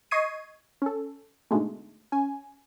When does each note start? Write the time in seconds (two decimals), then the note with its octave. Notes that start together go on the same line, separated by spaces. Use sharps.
0.11 D#5 C#6 D#6 G#6 C7 D#7
0.82 C#4 A4
1.51 G#2 B2 D3 G#3 A3
2.12 C#4 G#5